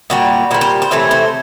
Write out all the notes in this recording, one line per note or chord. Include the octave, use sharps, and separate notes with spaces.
A#2 G3 F#4
A#2 G3 C5
C5
C5
C3 E3 A3 C#5
C5